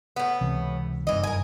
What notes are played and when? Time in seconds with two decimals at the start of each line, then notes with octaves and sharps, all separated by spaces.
0.16 A2 B3
0.41 C#2 C3 E3
1.07 F#1 G2 D#3 E3 D#5
1.23 A#4 G#5